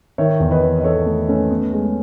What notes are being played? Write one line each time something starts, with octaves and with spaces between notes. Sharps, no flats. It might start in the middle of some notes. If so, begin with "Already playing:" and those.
D#3 C#5 E5
E2
B4 D#5
D#3
D#5
D#3 A4 C#5
A3
A3 C#4
B3
G#3